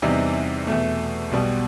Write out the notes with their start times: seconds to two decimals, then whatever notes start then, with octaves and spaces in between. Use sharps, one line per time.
0.02 E2 C3 E3 G3 D#4
0.67 E2 B2 A3
1.31 B1 B2 G3 B3